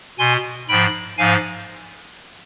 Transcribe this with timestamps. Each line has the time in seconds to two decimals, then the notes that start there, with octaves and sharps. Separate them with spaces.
0.18 B2 G#5 C6
0.69 G#2 F3 G5 B5
1.18 G#2 F3 F5 G#5